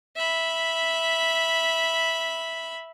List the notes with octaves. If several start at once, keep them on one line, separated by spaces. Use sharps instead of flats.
E5 B5